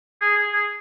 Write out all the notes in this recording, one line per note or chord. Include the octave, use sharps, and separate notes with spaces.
G#4
G#4
G#4